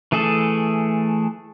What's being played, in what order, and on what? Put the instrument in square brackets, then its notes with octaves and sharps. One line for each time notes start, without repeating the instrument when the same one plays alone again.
[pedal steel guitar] E3 A3 G#4 A4